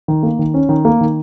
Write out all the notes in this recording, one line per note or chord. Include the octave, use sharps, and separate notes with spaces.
D#3
A#3
D#3
C#4
D#3
A#3
D#3